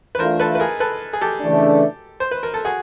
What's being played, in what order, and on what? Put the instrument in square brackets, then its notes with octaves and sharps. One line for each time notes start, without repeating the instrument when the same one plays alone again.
[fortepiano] B4
[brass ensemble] E3 A3 D4 F4 [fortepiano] A#4 C5
[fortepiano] A4 B4
B4
G#4 A#4
A4 B4
G#4
G4 A4
[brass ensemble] C#3 E3 A3 D4
[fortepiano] C5
B4
A#4
A4
F#4 G#4